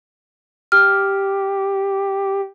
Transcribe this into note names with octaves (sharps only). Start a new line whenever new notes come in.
G4 F6